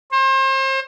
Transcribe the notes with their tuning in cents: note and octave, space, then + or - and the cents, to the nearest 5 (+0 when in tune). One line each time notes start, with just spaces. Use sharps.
C5 +35